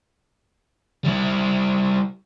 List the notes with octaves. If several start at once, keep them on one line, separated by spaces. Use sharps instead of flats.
G3 E4